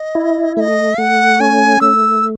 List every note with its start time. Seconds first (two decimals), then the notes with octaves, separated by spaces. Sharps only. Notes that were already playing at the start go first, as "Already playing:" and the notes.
Already playing: D#5
0.15 E4
0.57 A3 D#5 E5
0.98 A3 F#5
1.40 C#4 G#5
1.81 A3 E6